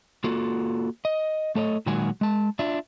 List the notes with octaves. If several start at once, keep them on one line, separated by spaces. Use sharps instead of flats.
A#3 F4 F#4 A4
D#5
A3 A4 C#5 D#5
A#2 D#3 F#3 G#3 F#4 G#5
G#3 A5
D4 F4 E5